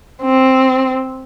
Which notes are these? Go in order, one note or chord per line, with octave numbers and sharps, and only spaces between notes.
C4